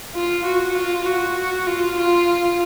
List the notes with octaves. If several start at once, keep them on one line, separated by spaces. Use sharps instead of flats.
F4
F#4
F4
F#4
F4
F4